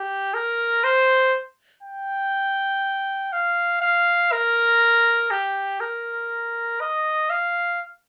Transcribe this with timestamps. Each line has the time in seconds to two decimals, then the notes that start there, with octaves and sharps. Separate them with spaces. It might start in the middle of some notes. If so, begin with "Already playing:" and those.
Already playing: G4
0.34 A#4
0.84 C5
1.83 G5
3.32 F5
3.81 F5
4.32 A#4
5.31 G4
5.80 A#4
6.80 D#5
7.30 F5